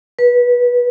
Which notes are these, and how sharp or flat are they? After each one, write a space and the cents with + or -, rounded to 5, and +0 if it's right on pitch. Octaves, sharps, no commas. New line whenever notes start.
B4 -20